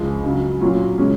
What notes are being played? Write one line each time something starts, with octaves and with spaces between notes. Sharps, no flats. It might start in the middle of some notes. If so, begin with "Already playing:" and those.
Already playing: C#2 C#3 F3 G#3
F#2 C#3 F#3
A#2 F#3 C#4 F4
C#3 G#3 C#4